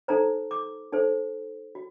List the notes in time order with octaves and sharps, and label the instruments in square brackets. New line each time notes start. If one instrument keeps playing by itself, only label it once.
[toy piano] D#4 A4 C5 A#5
D6
D#4 A4 C5
F#4